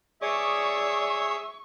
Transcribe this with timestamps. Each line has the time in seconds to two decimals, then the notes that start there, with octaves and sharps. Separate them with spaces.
0.22 G#4 C#5 D5 E5 C#6 D#6